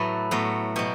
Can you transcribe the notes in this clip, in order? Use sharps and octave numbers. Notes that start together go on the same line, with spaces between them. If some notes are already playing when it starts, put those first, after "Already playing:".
Already playing: A2 F#3 A3 B3 E4 A4 B4
A2 F#3 B3
B2 F#3 G4